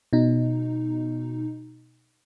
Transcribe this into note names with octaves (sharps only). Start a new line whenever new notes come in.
B2 D#4